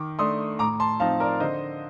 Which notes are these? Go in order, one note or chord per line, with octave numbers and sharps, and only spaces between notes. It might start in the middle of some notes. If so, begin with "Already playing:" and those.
Already playing: D#3 D6
A3 D4 C6 D#6
A2 A#5 D6
A5 C6
F3 C4 D#4 F5 A5
A#4 D5
D3 C5 D#5